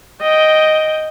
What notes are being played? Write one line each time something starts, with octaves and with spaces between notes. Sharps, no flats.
D#5 G5